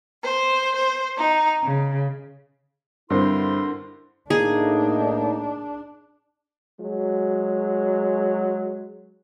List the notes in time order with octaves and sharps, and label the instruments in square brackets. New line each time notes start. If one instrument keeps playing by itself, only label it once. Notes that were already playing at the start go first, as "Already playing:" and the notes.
[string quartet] C5
C5
D#4
C#3
[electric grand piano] G2 [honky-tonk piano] D3 C4 C5 [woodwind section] E4 A#4 C6
[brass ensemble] A2 A#3 [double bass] D4 [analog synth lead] D#4 [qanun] G#4
[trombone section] F#3 G#3